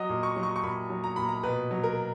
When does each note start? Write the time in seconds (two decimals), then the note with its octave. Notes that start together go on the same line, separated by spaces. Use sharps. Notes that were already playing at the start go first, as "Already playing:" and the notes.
Already playing: F#3 D#5
0.09 A#2
0.23 C#6
0.36 F#3
0.43 C#6
0.56 C#6
0.63 A#2 B5
0.90 F#3
1.04 A#5
1.16 A#2 B5
1.29 A#5
1.43 B2 B4
1.71 F#3
1.83 A#4